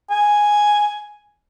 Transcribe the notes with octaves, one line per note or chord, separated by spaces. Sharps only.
G#5